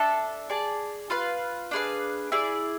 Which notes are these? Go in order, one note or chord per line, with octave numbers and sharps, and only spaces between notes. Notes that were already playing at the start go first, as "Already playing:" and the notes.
Already playing: D4 A4 E5 A5
G#4 D5 A5
F4 B4 F5
D4 G#4 B4 F5
E4 G#4 D5